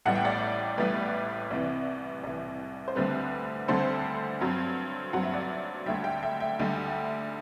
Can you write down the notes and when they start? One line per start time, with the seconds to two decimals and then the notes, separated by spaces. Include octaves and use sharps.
0.05 A1 A2 G3 B3 F#5
0.15 G5
0.25 D5 F#5
0.78 A1 A2 G3 B3 B4 D5
1.51 C2 C3 E3
2.23 C2 C3 E3
2.88 C5
2.95 D2 D3 G3 C4 B4
3.68 D2 D3 G3 C4 A4 C5
4.41 G2 F#3 C4
5.13 G2 F#3 C4 F#5
5.23 E5
5.33 D5 F#5
5.86 D2 D3 G3 E5 G5
6.04 E5 G5
6.23 E5 G5
6.40 E5 G5
6.59 D2 D3 G3